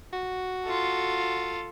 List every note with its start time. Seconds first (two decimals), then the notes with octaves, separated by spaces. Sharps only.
0.13 F#4
0.65 F4 A4